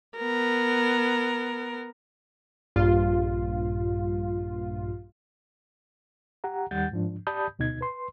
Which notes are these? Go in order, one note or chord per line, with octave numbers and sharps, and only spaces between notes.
B3 A#4
A#1 G2 F4
G4 F#5 A#5
D#2 D#3 G3 F#5 G6 A6
G#2 F3 D4
G4 D5 A5 B5 D#6 G6
D2 B2 D#4 G#6
B4 C6